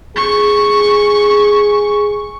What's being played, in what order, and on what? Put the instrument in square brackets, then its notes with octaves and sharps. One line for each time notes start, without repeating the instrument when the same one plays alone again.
[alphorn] G#4 [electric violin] C#6